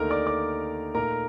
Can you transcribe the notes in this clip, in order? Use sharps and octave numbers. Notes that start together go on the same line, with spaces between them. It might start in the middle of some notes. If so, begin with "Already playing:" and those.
Already playing: D#2 D3 A3 D#4 A#4 A#5
D5 D6
D5 D6
A#2 A3 D#4 A#4 A#5